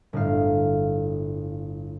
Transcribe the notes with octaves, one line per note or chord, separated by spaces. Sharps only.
G1 A2 F5